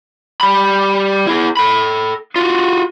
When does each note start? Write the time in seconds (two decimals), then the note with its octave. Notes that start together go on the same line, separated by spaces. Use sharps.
0.41 G3 B5
1.27 E4 G#4
1.57 A4 B5
2.36 F4 F#4